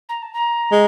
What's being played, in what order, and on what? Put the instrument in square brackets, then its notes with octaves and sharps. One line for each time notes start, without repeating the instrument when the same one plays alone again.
[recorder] A#5
A5
A#5
[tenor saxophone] G#3